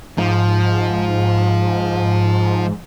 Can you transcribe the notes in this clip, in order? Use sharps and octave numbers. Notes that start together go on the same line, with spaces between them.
G#2 F3